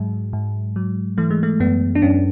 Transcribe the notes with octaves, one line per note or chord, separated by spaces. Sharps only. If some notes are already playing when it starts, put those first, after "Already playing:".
Already playing: G#2 F#3 G#3
G#2
F#3
E3 A3
G#3
A3
F#2 B3
D4
F#2 C#4